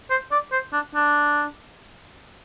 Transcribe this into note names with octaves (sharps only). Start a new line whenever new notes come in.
C5
D5
C5
D4
D4